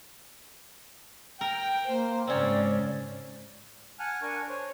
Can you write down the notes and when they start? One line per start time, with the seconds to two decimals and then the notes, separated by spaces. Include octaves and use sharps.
1.41 A#4 G5
1.89 A#3 C5
2.27 G#2 C#3 C4 C#4 D5
3.99 F#5 G#5 A5 F6 F#6
4.22 D4 A#4 G#5 A5 C#6
4.49 C5 C#5